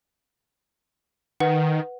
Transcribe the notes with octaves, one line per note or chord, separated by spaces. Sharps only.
D#3 B4 F#5